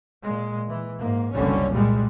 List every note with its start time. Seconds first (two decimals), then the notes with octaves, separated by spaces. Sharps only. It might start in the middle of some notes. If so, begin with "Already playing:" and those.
0.23 A#2 G#3
0.68 E3
0.99 G#2 A#3
1.34 F#1 C2 D3 G3 C#4
1.72 A#2 G3 G#3